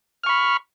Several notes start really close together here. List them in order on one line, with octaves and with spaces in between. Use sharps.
F6 C#6 B5